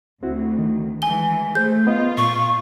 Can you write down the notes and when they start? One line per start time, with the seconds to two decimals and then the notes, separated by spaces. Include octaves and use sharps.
0.23 D2 C4 E4 F#4
0.59 D#3
1.02 E3 G#3 G#5 G7
1.55 A3 G#4 C5 G6
1.87 B3 F4 D#5
2.18 A#2 C#6